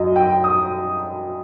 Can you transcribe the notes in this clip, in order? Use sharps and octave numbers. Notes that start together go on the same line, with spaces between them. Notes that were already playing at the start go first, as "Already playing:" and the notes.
Already playing: F#2 F#3 D#5
G5
D#6